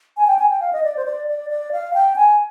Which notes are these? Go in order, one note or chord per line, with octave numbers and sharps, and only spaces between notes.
G#5
G5
G#5
G5
F5
D#5
D5
C5
D5
D5
D5
F5
G5
G#5